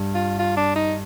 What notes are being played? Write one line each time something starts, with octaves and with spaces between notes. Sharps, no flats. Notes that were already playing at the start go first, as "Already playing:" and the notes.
Already playing: G2
F4
F4
D4
D#4